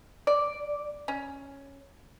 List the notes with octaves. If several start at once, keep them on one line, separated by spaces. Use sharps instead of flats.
D5
C#4